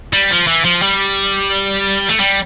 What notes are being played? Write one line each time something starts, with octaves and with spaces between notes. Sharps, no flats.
G3
F3
E3
F3
G3
A3
G3